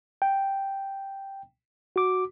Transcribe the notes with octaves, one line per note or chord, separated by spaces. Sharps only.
G5
F#4 D6